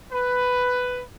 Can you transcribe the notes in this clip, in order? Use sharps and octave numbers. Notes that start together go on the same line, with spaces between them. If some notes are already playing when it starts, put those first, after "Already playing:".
B4